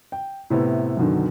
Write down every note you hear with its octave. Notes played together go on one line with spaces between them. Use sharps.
G5
A2 C3 B3 E4
F#2 B2 D3 D#3